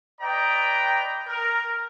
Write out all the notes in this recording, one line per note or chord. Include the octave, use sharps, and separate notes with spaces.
B4 D5 D#5 G5 A#5
A#4